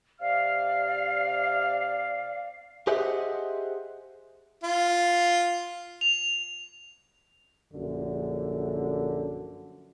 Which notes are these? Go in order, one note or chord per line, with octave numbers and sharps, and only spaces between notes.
C3 D5 F5 F6
G4 G#4 C5 D#5 E5 F#5
F4
F7
A#1 F#2 D3